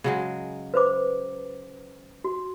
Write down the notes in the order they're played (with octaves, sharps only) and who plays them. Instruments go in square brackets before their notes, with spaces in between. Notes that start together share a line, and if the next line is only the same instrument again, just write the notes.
[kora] C#3 F#3 G#3
[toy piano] B4 C5 D6
F#4